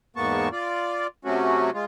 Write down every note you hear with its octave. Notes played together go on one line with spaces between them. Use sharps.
E2 G#2 A#3 B3 A5 C#6
F4 D5
C3 F#3 A3 C#4 F#4
G#3 F4